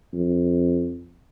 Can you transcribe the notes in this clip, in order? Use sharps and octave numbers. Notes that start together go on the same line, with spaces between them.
F2